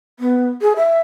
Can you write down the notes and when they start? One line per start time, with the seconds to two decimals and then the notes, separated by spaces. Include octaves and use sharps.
0.20 B3
0.61 G#4
0.76 E5